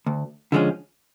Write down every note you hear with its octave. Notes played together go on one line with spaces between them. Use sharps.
D2
D3 F3 G#3 C#4